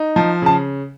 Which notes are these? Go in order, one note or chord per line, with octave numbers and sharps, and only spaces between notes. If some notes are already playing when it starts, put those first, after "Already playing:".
Already playing: D#4
F3 A5
C#3 A5